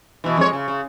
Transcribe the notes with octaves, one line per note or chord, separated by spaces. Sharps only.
B2 E3
F2 G#3 C#5
C#3
C#3